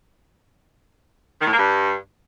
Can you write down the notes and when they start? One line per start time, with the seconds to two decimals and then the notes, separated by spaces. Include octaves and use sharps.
1.41 D#3
1.47 A2
1.53 A#3
1.59 G2